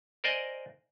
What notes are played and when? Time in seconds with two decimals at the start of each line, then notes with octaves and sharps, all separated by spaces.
0.24 A#4 C5 D5 D#5 G#5